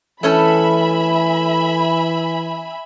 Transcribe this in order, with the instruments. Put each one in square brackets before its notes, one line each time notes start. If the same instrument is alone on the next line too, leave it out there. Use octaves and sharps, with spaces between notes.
[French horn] E3 [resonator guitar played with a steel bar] A3 C#4 A4 [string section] E5 G#5 B5